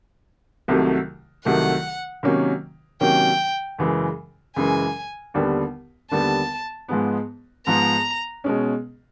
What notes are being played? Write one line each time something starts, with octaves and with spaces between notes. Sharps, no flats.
C2 C3 D#3 F#3 A3
C2 C3 D#3 F#3 A3 F#5
C3 D#3 F#3 A#3 C#4
C3 D#3 F#3 A#3 C#4 G5
F#2 C#3 E3 G#3
F#2 C#3 E3 G#3 G#5
D#2 D3 G3 B3
D#2 D3 G3 B3 A5
G#2 F3 G#3 B3
G#2 F3 G#3 B3 A#5
B2 G#3 C#4